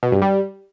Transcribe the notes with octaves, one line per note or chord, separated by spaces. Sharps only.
B2
G2
G3